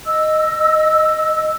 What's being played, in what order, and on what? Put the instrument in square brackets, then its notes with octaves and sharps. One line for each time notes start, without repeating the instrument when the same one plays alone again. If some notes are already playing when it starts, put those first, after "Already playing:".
[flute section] D#5 E6